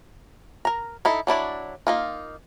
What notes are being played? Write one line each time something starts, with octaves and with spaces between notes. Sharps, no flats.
A#4 A#5
D#4 E4 A4
F#3 D4 E4 D5
A#3 D#4 F4